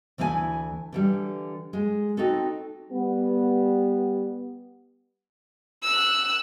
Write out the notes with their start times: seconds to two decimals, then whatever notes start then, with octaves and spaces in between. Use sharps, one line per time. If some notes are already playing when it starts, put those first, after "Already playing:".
0.18 D2 E3 E4 D#5 G#5
0.92 D3 E3 G3
1.73 G#3
2.17 C4 D#4 F#4 A4
2.91 G3 B3
5.83 E6 F#6